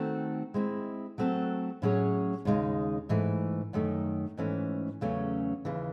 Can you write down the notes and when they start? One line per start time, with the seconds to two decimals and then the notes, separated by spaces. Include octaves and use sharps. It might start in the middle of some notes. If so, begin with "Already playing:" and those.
Already playing: D#3 A3 C4 F#4 A4
0.54 G#3 C4 E4
1.18 F#3 A3 C4 F#4 A4
1.82 A2 F#3 C#4 G#4 C#5
2.45 D#2 C#3 G#3 D#4
3.09 G#2 E3 A3
3.73 F#2 D#3 A3
4.37 G#2 E3 A3 C#4
5.01 E2 C#3 F#3 A3 C#4
5.65 D#2 C#3 E3